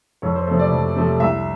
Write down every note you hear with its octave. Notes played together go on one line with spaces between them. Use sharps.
F2 C#5
C5
C3 F3 A3
D5
F2
C3 F3 A3
C2 E5